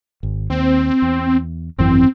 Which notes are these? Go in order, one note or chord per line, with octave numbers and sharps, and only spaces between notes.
G#1
D#2 C4
E2
G#1 F#2 E3 C4